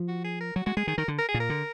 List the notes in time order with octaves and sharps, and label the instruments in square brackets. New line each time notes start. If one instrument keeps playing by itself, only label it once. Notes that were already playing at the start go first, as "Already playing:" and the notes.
Already playing: [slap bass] F3
[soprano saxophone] F#4
G#4
A#4
[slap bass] F#3 [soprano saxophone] F#4
[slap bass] G#3 [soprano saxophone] F#4
[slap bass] G#3 [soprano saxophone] G#4
[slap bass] D#3 [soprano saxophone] G#4
[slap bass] D#3 [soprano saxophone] A#4
[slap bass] D3
[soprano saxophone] A#4
G#4
[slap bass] A#2
[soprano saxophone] A#4
[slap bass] D3